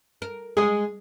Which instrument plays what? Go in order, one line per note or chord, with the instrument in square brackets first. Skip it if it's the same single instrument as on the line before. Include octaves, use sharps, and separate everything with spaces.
[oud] A#4
[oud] G#3 [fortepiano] G#4 D#6